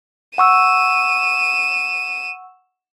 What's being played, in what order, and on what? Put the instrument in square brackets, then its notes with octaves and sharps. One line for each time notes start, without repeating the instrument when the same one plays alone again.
[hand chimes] F#5 C#6 E6 [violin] D#7 E7